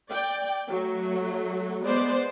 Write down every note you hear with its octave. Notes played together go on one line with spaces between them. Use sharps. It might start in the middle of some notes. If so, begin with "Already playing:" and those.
D5 G5
F#3 A3
G#3 B3 C5 D5